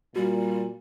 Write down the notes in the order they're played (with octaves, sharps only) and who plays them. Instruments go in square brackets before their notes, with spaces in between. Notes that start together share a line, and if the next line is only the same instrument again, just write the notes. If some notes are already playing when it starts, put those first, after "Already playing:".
[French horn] A#2 [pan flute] G3 [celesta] F#4